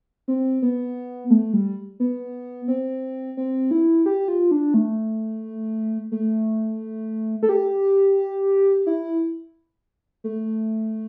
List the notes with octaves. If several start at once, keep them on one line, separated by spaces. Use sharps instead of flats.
C4
B3
A3
G3
B3
C4
C4
E4
G4
F4
D4
A3
A3
A4
G4
E4
A3